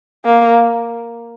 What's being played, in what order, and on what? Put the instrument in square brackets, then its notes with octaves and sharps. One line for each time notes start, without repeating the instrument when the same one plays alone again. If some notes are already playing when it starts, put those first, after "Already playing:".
[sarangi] A#3